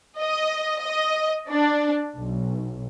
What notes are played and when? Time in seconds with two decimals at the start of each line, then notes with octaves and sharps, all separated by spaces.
0.20 D#5
0.83 D#5
1.49 D4
2.17 B1